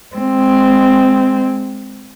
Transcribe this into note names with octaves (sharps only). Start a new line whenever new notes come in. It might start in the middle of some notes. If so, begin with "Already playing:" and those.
G#3 C4